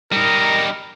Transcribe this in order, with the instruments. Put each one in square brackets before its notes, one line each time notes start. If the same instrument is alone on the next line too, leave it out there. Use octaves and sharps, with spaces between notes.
[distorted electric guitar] G3 D#4 [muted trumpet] A#4